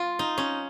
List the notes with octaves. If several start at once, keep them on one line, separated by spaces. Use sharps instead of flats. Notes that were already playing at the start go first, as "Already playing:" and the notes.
Already playing: F4
D#4
C#4